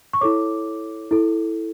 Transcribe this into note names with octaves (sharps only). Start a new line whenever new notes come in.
C#6
E4 A4 C#5 D6
E4 A4